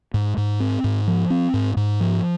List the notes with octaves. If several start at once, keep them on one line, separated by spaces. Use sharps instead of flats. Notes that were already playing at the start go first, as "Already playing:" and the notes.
G#2
G#2
C4
G#2
F3
C4
G#2
G#2
F3